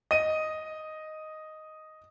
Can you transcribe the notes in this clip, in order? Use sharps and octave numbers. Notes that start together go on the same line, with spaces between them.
D#5 D#7